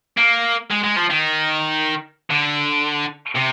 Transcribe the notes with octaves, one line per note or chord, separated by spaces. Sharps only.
A#3
G#3
G#3
F3
D#3
D3
C3